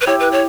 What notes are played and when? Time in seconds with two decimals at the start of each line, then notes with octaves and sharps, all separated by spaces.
0.01 B4
0.07 E4 G4 C#5
0.20 B4
0.32 C#5